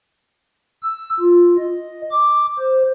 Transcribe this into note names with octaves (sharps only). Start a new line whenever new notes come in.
E6
F4
D#5
D6
C5